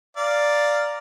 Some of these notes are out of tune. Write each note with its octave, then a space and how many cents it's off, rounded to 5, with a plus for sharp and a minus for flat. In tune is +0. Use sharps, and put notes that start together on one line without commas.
D5 +0 F5 +0 A#5 +0